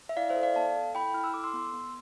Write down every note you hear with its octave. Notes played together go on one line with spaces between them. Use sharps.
E5
E4 D5 F5
C5 E5
A4
D5 F5
B3 F5 A5
A4
E4 G5 B5
E4 F6
E6
A4 D6
C6 E6
B3
B3